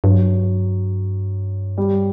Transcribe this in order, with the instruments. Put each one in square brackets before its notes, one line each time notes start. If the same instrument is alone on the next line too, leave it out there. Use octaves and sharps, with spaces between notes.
[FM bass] G2 [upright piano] F#3
[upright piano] G3